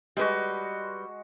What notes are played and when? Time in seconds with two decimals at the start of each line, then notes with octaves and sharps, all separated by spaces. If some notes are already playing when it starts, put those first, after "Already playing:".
0.17 G3 G#3 F#4 B4